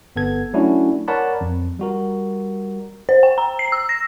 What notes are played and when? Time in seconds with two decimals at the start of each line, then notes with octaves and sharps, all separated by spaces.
0.16 G1 B3 A4 G#6
0.53 F#3 A3 C#4 D4 E4 F#4
1.08 A#4 C#5 D5 F#5 A5 B5
1.41 F2
1.79 G3 F#4 A#4
3.09 C5
3.23 G5
3.38 A#5
3.59 C7
3.72 E6
3.89 A#6